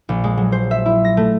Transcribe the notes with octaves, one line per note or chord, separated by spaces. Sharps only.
A#1
G#3
F#3
C5
E5
E4
A#6
A3